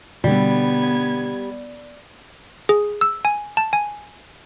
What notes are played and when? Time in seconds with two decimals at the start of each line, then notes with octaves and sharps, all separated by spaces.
0.24 B2 D3 G3 B3 G#6
2.69 G#4
3.01 E6
3.25 G#5
3.57 A5
3.73 G#5